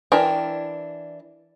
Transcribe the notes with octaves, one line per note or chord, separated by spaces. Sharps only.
E3 D4 A#4 G5